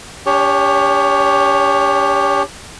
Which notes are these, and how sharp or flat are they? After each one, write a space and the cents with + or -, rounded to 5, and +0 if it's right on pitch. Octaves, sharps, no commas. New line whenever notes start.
D4 -40 G4 +25 C#5 +15